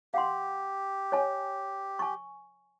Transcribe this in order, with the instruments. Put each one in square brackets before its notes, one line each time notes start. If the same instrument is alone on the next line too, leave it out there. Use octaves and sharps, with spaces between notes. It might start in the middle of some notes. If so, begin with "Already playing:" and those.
[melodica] G4 [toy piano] F5 F#5 C6
[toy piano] C#5 D#5 G#5
G#5 C#6